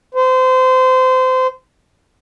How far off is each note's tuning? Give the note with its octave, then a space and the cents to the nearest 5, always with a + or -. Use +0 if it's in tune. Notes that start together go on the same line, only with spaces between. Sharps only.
C5 -25